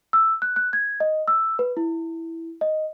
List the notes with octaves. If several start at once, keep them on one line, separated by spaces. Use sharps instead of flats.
E6
F#6
F#6
G#6
D#5
E6
B4
E4
D#5